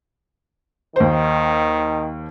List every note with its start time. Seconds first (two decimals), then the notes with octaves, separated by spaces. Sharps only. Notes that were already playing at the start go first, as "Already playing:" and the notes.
0.96 D#2 D#3 C5